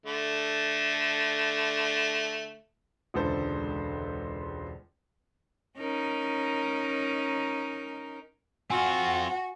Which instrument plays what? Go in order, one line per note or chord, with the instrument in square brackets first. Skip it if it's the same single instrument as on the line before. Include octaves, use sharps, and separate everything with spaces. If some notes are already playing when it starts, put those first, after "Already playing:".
[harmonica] D3 A3
[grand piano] E1 C#2 D3 A4 C5
[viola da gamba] C#4 D#4 A#4
[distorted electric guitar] C4 F4 [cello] F#4 [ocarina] F#5 [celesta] G#5